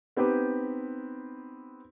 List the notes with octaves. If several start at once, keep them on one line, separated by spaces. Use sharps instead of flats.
B3 C4 D#4 G4 B4